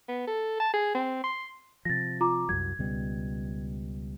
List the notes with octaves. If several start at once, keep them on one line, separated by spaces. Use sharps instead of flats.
B3
A4
A5
G#4
C4
C6
C3 F3 A6 A#6
F4 A#5 D6
C2 F#2 F#3 G#6
C#2 B2 G3